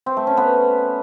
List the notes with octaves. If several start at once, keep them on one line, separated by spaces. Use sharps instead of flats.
C4
A3
C#4
B3